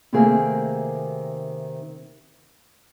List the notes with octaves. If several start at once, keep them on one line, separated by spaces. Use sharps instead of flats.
C3 D#3 A3 A#3 C4 G#4